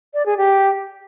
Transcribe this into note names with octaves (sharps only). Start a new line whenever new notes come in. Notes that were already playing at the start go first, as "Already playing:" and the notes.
D5
G#4
G4